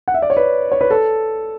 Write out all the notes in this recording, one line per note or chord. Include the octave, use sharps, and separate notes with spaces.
F#5
E5
D5
C#5
B4
C#5
B4
A4